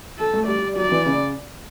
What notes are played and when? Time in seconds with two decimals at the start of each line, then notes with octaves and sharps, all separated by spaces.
0.18 A4
0.33 A3
0.47 G3 D5
0.76 F#3 D5
0.92 E3
1.06 C#3